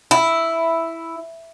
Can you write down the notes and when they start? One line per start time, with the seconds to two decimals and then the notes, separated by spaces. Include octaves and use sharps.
0.11 E4